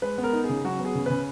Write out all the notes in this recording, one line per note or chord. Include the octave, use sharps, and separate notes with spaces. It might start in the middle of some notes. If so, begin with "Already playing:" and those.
G#3 B4
B3
A#4
D#4
G#4
C#3
F#3 F#4
B3
G#4
C#3
C#3 B4